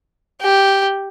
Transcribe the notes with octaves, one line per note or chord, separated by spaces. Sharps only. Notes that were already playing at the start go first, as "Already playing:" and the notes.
G4